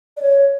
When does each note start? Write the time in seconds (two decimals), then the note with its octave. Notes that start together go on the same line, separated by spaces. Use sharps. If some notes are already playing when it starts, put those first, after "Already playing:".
0.17 D5
0.22 C#5